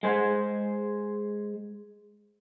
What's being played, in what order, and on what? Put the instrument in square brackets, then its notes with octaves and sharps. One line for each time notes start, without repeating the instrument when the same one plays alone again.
[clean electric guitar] G#3 G#4 C5